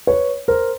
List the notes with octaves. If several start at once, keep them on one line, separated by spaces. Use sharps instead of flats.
B4 C#5
A#4 C5